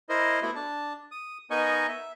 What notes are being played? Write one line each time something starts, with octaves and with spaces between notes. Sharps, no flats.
E4 A#4 C5 D#5
A3 B3 E4 F#4 E5
D4 A5
D#6
B3 D#4 A#4 D#5 G#5 C#6
E5